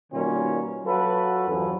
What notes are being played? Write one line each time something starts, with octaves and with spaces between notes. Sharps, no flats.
B2 D#3 G3 A#3 C#4 F4
F#3 F4 F#4 A4 B4
E2 G2 F3 F#3 C#4